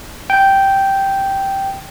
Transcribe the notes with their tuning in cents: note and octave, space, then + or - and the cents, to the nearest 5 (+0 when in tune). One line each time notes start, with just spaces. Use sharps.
G5 -5